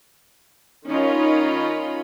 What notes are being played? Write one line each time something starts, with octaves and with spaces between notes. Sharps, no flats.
D#3 C#4 D#4 F4 C#5 B5